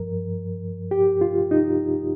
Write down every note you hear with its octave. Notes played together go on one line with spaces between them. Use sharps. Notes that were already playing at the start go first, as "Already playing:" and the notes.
Already playing: G2 F3 A#4
G4
F4
D#4